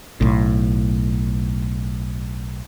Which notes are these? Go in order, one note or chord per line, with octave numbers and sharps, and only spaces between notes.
B1 A2